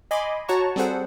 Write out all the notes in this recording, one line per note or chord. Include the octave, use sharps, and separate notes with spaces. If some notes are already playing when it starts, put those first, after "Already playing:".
D#5 G#5 B5 C6 D6
F#4 C#5 F#5 A5 A#5 C#6
G3 C4 G#4 A4 C5 F#5